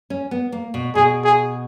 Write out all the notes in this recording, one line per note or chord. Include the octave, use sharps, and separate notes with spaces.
C#4
B3
A#3
B2
B2 G#4
G#4